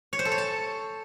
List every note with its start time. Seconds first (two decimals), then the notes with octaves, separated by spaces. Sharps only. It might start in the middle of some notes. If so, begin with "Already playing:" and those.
0.13 C#5
0.19 C5
0.25 A4
0.32 C#5
0.38 A5